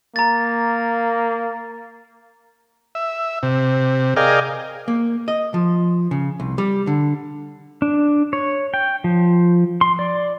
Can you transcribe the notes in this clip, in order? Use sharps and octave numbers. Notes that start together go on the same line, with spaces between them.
A#3 A#5 A6
E5
C3
G#4 A#4 D5 D#5 F5 G5
A#3
D#5
F3
C#3
C2
G3
D3
D4
C#5
G5
F3
C6
D5